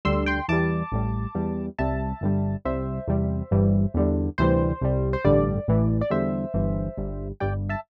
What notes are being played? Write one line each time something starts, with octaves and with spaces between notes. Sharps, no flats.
D2 D3 G3 C6 E6
G5 C6
E2 E3 G3 A5 D6
A1 A2 G3
E2 E3 G3
C2 C3 G3 E5 A5
G1 G2 D3 G3
C2 C3 G3 C5 E5
E2 C3 G3
G1 G2 E3 G3
E2 D3 G3
D2 C3 E3 G3 C5
C2 C3 G3
C5
A1 G2 D3 G3 D5
A1 A2 E3
D5
E2 D3 G3 C5 E5
G1 G2 E3 G3
G1 G2 G3
G1 G2 G3 D5 G5
E5 A5